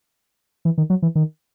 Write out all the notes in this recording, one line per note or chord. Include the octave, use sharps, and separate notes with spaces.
E3
D#3
F#3
E3
D#3